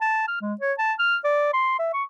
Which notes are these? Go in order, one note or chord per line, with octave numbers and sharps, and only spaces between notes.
A5
F6
G#3
C#5
A5
F6
D5
C6
E5
C#6